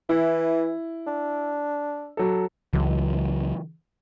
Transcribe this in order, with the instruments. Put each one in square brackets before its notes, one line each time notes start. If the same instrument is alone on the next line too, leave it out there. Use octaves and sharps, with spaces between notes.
[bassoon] E3 [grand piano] E4
[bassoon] D4
[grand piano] F#3 A4
[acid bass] C#2 [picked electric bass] C#3 E3 F#3